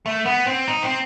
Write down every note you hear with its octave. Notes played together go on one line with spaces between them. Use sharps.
A3
B3
C4
D#4
C4